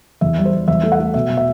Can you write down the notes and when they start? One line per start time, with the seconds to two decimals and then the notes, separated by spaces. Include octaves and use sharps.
0.21 E2 E5
0.38 G3
0.45 C5
0.53 G3
0.68 E2 E5
0.83 A3
0.92 F#5
1.00 A3
1.14 B2 E5
1.30 B2
1.37 E5